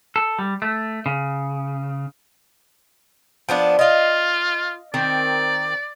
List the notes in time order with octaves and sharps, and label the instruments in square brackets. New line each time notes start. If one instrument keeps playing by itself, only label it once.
[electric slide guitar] A4
G3
A3
C#3
[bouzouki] F3 B3 D4
[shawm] F4 [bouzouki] D#5 F5
[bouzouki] D#3 C4 A#4 [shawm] D5